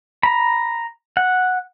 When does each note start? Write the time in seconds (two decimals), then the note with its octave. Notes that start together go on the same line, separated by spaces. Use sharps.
0.23 A#5 B5
1.17 F#5